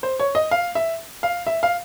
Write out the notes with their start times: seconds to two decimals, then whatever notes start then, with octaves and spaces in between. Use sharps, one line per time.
0.03 C5
0.20 C#5
0.35 D#5
0.51 F5
0.75 E5
1.23 F5
1.47 E5
1.63 F5